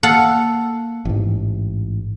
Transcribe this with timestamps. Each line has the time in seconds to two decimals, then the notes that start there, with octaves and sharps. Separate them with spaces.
0.03 A#3 A4 F5 F#5
1.05 A1 G#2